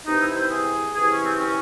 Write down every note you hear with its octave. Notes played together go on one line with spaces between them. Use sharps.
C3 E3 D#4
E4
C5
G#4
C3 E3 G#4
C#4
C4
C#4